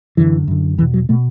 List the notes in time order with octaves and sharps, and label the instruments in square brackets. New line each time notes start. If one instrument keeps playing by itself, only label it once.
[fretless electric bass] F#2 D3 E3
F#2 D3
E2 E3
B2
F#3
B2 A3